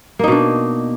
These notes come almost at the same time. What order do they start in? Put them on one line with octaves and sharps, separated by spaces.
A#3 D#4 B2 D4